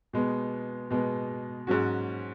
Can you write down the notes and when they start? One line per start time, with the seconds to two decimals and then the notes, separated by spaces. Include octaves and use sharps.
0.13 B2 G#3 B3
0.90 B2 G#3 B3
1.67 G#2 F#3 C#4 F#4